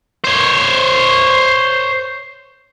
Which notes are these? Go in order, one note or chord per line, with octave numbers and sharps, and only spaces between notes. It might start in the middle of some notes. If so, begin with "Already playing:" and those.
C5 C#5